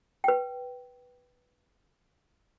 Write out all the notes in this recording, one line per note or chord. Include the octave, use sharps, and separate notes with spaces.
B4 G5